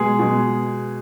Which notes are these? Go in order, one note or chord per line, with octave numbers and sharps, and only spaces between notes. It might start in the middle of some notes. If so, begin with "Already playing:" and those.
Already playing: B2 G#3 G#4
B2 G#3